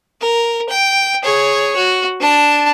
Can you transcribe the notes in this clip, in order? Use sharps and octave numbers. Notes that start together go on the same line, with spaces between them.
A#4
G5
G#4 C#5
F#4
D4 A5